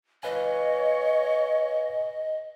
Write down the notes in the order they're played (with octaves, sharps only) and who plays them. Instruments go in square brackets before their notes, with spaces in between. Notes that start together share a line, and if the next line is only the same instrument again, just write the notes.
[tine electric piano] B4 F5 G#5 [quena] C#5 [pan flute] D#5